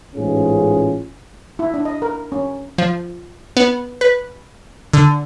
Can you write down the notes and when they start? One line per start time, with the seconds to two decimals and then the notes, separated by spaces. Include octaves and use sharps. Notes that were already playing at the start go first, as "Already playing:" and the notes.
0.15 A1 G#2 C#4 F4 G#4
1.59 E4
1.74 D4
1.85 D#5
2.02 A#4
2.32 C#4
2.78 F3
3.57 B3
4.01 B4
4.94 D3